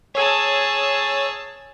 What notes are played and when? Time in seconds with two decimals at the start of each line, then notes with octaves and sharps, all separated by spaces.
0.15 G#4 C#5 A5 E6